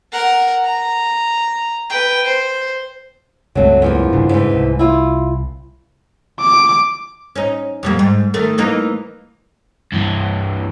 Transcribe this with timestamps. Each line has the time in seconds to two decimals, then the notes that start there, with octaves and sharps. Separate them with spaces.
0.12 A#4 F#5
0.65 A#5
1.89 B4 G5
2.25 C5
3.55 C#2 G2 F#3 A3 C4
3.82 E2 F3 A#3
4.12 G2 C#3 D4
4.29 G#2 E3
4.54 C2
4.79 E4 F4
6.41 D6
7.35 C#4 D#4
7.83 F2 G3 A#3
7.99 G#2
8.34 D#3 A3
8.58 E3 A#3 D#4
9.92 G2 E3